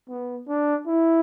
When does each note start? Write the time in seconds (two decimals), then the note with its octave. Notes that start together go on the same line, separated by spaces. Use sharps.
0.09 B3
0.49 D4
0.87 E4